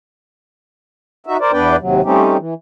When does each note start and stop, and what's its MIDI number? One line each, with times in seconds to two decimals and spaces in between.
1.27 1.37 63
1.27 1.37 66
1.27 1.37 76
1.40 1.52 70
1.40 1.52 72
1.40 1.52 74
1.52 1.76 40
1.52 1.76 59
1.52 1.76 62
1.52 1.76 71
1.52 1.76 74
1.52 1.76 79
1.80 2.01 39
1.80 2.01 48
1.80 2.01 54
2.04 2.37 55
2.04 2.37 57
2.04 2.37 60
2.04 2.37 61
2.04 2.37 63
2.04 2.37 67
2.38 2.54 52